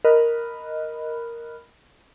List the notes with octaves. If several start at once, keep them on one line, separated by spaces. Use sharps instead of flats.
A#4 D#5 B5 F6 F#6